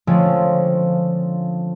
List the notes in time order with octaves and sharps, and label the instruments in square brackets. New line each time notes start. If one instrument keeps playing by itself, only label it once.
[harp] D3 F3 G#3 A3 C4 C#4